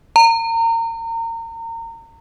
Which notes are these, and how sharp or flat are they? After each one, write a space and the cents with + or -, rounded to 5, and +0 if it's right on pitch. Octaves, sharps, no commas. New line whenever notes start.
A#5 -30